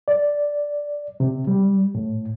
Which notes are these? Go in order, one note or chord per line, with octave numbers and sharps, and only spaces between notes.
D5
C3
G3
A2